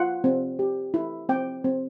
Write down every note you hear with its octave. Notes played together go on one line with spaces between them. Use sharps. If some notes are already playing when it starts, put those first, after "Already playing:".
Already playing: F4 F#5
C4
G4
E4
C4 G5
C4